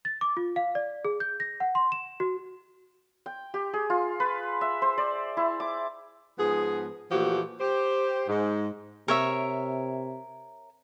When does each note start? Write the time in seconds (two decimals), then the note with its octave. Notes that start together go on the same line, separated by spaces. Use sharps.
0.05 A6
0.21 D6
0.37 F4
0.56 F5
0.75 D5
1.05 G#4
1.20 G6
1.40 A#6
1.60 F#5
1.75 C6
1.92 E7
2.20 F#4
3.26 G5
3.54 G4
3.73 G#4
3.90 F4
4.20 B4
4.61 E5
4.82 C5
4.98 D5
5.37 E4
5.60 D6
6.39 G#2 F3 B3 G#4
7.11 A#2 E3 F3 A3 F#4 G4
7.60 G4 C5
8.29 G#2
9.08 C3 A#4 C#5 E5